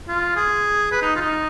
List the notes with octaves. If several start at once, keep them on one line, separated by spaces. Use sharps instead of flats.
F4
G#4
B4
D#4
F4
D#4